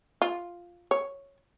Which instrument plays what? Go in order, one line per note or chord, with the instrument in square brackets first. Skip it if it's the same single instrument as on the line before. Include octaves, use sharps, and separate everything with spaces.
[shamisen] F4
C#5